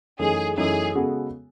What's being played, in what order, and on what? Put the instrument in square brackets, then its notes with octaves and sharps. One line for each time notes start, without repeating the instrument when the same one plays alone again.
[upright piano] F#2 E3 A3 D#4 [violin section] G#4
[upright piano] F#2 E3 A3 D#4 [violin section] G#4
[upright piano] C#3 G#3 B3 F#4 A4